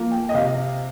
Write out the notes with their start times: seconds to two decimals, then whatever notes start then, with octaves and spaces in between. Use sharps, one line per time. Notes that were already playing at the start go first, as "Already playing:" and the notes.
Already playing: F3 A#3
0.11 G5
0.29 D#5
0.34 C3 F5